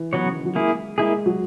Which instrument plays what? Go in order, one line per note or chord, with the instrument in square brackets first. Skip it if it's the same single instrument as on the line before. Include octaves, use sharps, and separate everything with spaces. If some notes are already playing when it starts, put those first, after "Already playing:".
Already playing: [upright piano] E3
[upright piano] E3 [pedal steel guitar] F#3 B3 F#4 C#5
[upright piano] C#3
D#3
F#3
[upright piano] G#3 [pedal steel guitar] A#3 E4 G#4
[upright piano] G#3 [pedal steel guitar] A#3 E4 G#4
[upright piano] F#3